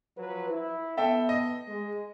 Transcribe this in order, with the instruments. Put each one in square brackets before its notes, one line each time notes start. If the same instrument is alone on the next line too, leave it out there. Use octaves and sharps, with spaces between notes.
[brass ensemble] F3 F#3 B4
E4
[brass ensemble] B3 [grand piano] A4 E5 G5
[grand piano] D#5
[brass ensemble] G#3